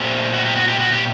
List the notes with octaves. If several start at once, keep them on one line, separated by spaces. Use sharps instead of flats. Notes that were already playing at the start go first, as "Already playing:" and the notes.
Already playing: A#2 A3 C4 G4
F#4
G4
F#4
G4
F#4
G4